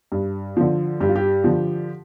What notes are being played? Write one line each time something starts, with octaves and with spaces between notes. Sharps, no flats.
G2
D3 F3
G2 G4
F4
G4
D3 F3